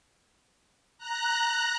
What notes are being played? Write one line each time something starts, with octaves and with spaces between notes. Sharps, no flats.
A#5 F#6